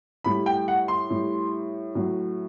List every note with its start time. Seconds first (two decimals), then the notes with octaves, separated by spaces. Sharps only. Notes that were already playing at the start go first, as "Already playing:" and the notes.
0.24 A2 G3 B5
0.46 G5
0.68 F#5
0.88 C6
1.10 A2 G3
1.95 A2 F#3